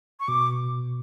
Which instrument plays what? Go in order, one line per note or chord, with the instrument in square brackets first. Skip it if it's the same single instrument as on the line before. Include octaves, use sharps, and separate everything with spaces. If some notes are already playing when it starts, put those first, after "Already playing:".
[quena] C#6
[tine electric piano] B2 [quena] D6